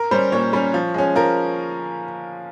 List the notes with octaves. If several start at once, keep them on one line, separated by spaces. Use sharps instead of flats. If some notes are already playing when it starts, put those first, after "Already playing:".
Already playing: A#4
G3 C#4 C5
A#2 C#5
G3 C#4
F3
G#3 C#4
F3 A#4